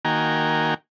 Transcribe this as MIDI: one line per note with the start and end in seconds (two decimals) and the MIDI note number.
0.05 0.74 51
0.05 0.74 58
0.05 0.74 66
0.05 0.74 79
0.05 0.74 80
0.05 0.74 82